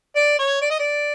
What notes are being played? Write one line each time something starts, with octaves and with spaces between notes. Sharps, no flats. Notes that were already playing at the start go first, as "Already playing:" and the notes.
D5
C#5
D5
D#5
D5